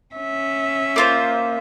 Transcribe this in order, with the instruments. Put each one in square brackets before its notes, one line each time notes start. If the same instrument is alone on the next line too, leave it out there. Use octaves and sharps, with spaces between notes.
[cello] C#4 E5
[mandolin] A#3 F4 C5